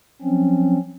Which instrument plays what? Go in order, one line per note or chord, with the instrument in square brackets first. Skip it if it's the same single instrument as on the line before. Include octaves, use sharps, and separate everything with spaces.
[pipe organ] F3 F#3 C4 C#4